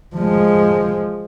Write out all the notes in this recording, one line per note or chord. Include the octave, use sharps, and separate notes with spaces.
F3 G#3